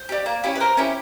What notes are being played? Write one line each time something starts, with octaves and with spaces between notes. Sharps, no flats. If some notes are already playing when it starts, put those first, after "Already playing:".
Already playing: C5
D4 G4
A#3
C#4 E4 G4
B4
A#3 A#4 C5
C#4 E4 G4